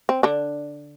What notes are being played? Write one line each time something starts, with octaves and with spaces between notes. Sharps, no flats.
C4
D3 D4